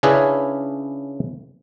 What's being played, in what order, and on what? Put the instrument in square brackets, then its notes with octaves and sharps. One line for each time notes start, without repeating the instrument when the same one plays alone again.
[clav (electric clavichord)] C#3 C#4 D4 E4 G#4 B4